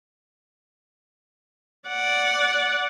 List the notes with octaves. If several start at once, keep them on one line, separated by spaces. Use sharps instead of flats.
D5 F#5